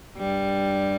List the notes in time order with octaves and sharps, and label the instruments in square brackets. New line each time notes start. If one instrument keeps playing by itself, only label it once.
[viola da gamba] G2 G3